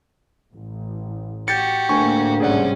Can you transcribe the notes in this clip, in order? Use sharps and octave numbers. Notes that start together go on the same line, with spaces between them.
A1
F#4 G4 G6 A6 C#7
D2 A2 A#3 G#5 C#6
G#1 C3 G3 C#4 G#4 D5 F#5